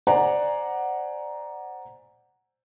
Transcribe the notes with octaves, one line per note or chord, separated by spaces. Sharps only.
C5 D5 F#5 G#5 A#5